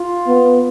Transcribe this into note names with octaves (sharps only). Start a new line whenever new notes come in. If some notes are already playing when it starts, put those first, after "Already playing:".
Already playing: F4
B3